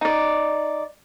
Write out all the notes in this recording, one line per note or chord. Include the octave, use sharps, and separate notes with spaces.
D#4 D5